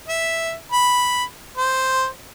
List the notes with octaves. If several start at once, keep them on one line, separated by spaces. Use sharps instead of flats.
E5
B5
C5